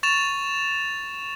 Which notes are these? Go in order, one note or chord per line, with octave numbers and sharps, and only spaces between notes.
C#6 A6 E7 F7